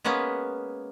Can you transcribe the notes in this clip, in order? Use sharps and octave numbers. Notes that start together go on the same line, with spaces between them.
G#3 A#3 B3 C#4 B4